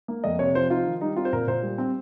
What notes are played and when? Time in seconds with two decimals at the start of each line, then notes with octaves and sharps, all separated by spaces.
0.08 A#3
0.24 F2 D#5
0.39 C3 C#5
0.55 F3 C5
0.70 D#4 F4
0.86 D#3
1.01 G3 D#4
1.16 C4 F4
1.25 C5
1.33 A#2 A#4
1.47 A#2 C5
1.63 G3
1.78 C4